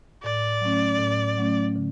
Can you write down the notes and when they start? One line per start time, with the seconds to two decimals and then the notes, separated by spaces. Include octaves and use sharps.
0.23 A2 D5
0.61 F#3 A3 C#4
0.99 A2
1.38 F#3 A3 C#4
1.76 D3